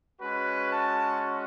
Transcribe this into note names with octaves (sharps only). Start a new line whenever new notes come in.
G#3 C#4 F#4 B4
A5